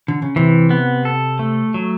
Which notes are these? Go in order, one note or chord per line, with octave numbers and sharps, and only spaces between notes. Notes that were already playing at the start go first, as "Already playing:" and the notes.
D3
C#3
C3 E3
B3
A4
A3
F#3